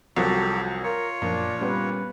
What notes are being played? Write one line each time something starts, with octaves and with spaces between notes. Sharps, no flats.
C2 F3 F#3 F#4 G4 A4
F4 A#4 C#5
F#2 A#2 F3 D4
G3 B3 C#4 B4